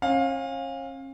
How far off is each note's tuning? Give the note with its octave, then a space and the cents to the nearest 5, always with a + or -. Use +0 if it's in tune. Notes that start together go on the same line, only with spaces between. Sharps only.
C#4 -40 F5 +20